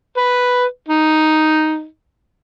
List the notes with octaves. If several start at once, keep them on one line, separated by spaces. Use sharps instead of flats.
B4
D#4